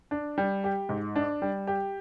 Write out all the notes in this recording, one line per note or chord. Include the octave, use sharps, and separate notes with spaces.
D4
G3
G4
G#2
D4
G3
G4